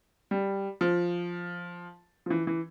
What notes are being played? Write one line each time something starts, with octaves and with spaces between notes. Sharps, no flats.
G3
F3
F3
E3
E3